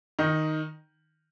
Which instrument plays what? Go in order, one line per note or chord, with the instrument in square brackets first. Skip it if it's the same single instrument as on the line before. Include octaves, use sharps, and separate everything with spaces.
[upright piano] D#3 D#4